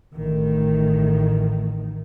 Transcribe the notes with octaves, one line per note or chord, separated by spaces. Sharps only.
A1 A2 D#3